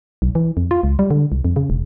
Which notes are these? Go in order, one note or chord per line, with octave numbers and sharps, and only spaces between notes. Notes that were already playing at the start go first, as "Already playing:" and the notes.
B1
E3
F2
F4
C#2
G3
D3
C2
F2
C#3
E1